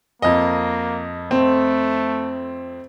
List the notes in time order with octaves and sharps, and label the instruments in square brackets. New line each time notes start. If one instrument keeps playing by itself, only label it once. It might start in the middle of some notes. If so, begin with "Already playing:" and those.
[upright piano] F2 D#5 [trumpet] A#3
[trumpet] A3 [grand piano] C4